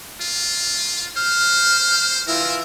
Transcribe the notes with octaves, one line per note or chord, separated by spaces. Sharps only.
F4
C5 F6
E3 F4 A#4 E5